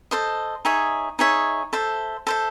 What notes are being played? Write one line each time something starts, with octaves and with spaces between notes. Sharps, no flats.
A4 C5 D#5
D#4 G#4 C#5 E5
D#4 G#4 C#5 E5
A4 C5 E5
A4 C5 E5